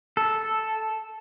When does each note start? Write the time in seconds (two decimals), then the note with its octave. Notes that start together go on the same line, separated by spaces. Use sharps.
0.17 A4